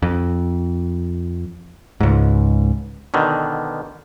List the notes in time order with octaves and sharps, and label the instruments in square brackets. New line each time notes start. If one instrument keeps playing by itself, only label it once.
[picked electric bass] F2
C#2 G#2
[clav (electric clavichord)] B2 D3 D#3